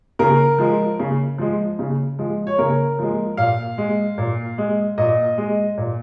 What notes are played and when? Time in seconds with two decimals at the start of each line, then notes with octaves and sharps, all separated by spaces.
0.19 C#3 A#4
0.58 F3 G#3
1.00 C#3
1.38 F3 G#3
1.79 C#3
2.19 F3 G#3
2.47 C#5
2.58 C#3 A#4
2.99 F3 G#3
3.37 A#2 F5
3.78 G#3
4.18 A#2
4.58 G#3
4.98 A#2 D#5
5.38 G#3
5.77 A#2